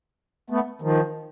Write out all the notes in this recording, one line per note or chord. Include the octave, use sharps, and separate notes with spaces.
A3 B3
D#3 F3